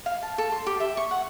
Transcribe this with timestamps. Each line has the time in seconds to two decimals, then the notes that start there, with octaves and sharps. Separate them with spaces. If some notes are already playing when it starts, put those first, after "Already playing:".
0.06 F5
0.22 A5
0.38 A4
0.52 C6
0.66 G4
0.80 E5
0.97 C#6
1.11 F#5